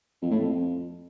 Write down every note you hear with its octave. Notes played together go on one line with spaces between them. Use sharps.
F2
A2
F2